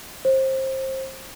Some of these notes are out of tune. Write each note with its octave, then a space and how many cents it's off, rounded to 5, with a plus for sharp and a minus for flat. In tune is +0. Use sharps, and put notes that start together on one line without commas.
C5 +25